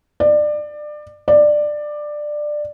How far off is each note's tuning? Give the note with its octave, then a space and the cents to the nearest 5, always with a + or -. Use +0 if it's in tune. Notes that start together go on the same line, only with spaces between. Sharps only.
D5 +25
D5 +15